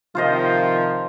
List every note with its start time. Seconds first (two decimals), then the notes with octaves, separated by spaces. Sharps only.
0.15 C3 D#3 F3 F4 C5 D#5